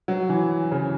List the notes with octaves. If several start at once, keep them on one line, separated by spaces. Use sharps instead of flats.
F#3
E3
C#3